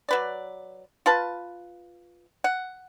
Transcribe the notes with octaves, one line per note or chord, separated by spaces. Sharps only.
F#3 B4 D5
F4 B4 A5
F#5